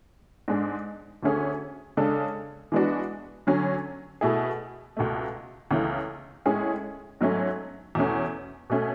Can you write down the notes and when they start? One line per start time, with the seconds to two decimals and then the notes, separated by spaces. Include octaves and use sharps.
0.48 G#2 G#3 D4
1.23 D2 D3 A3 C#4 G#4
1.97 C#3 G#3 D4 A4
2.72 E3 G#3 B3 D4 F#4
3.47 D3 F#3 C#4
4.21 B2 A3 E4 G#4
4.97 C#2 B2 A3
5.71 C#2 C#3 E3 A3
6.46 A2 G#3 C#4 G#4
7.21 G#2 F#3 A3 C#4
7.95 E2 B2 A3 C#4
8.70 B2 A3 C#4